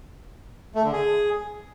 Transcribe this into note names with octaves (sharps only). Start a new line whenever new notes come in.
A3
D3
G#4